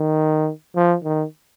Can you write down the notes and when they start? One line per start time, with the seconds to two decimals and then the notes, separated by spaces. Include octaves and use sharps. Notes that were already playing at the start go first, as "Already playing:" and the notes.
Already playing: D#3
0.76 F3
1.04 D#3